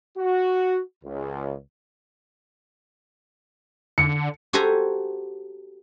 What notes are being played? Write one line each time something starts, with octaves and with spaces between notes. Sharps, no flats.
F#4
C#2
D3 C#7
F#4 G4 A4 C5 G#5 A#5